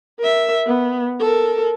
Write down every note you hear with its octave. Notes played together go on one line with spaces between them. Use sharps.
A#4 E5
B3
A4 A#4